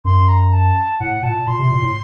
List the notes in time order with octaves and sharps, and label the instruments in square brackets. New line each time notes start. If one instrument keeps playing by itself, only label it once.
[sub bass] F#2 [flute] C6
[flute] A#5
A5
[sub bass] A2 [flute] F#5
[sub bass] A#2 [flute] A5
[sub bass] A#2 [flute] C6
[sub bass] C3
A#2
A2